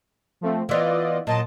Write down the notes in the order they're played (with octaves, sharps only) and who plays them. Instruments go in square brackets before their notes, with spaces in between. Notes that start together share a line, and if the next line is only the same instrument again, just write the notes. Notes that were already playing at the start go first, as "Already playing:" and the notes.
[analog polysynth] F3 A3 C4
[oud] E3 B3 [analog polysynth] F4 D5 D#5
[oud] A#2 F#3 [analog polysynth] D#5 A5